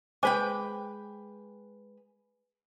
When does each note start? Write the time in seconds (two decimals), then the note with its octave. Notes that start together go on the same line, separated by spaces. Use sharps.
0.23 G#3 B4 C5 G5 G#5 D6